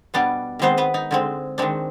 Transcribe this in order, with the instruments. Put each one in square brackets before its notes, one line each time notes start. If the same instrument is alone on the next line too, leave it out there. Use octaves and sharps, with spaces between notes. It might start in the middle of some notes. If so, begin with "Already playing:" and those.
[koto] B2 G3 B3 D4 D5
D#3 G#3 B3 C4 C5
B3 B4
D#4
D3 G#3 C4
D#3 G#3 C4 D4